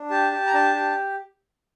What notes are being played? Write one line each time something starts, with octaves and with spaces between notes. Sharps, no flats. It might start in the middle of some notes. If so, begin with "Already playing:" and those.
Already playing: D4
G4 A5
G4
A#5
D4 A5
G4